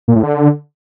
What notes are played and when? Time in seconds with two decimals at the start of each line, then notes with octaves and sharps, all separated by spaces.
0.08 A#2
0.16 A2
0.23 D3